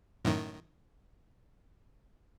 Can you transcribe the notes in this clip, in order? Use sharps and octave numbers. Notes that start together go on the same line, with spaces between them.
F#2 A2 D#3